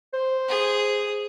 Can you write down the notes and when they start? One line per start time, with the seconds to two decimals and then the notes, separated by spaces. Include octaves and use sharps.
0.13 C5
0.49 G#4